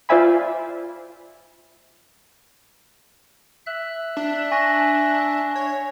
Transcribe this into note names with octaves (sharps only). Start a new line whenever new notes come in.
F4 C5 D5 E5 G#5 B5
E5 F#6
D4
G#5 C#6 A#6
C#5